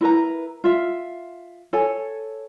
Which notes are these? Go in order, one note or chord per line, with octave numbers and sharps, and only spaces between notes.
E4 A#4 B4 A#5
F4 E5
A4 C#5 G#5